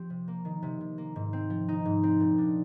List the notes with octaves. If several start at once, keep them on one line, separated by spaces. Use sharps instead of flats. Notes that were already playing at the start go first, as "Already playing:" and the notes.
Already playing: F3 C4 G4
C3
A#3
D#3
C3
C3
A#3
G#2
C4
F3
D#4
G#2
C4
A#2
D4